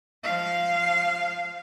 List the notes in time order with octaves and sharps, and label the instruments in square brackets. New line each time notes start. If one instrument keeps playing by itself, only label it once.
[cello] F3 F5